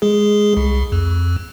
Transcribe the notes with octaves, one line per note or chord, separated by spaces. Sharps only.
G#3 G#4
C2
F2